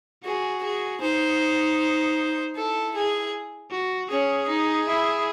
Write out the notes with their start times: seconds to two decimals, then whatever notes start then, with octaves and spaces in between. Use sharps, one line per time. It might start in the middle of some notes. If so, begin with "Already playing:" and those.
0.24 F#4 G#4
0.63 G#4
1.01 D#4 C5
2.55 E4 A4
2.94 G#4
3.71 F#4
4.10 C#4 G#4
4.48 D#4
4.87 E4